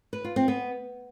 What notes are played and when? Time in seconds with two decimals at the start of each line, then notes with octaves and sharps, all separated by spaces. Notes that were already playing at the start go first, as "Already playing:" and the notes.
0.13 B4
0.24 F4
0.36 C4
0.48 B3